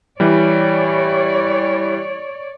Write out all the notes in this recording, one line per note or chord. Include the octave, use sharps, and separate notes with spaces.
E3 G3 C#5 D5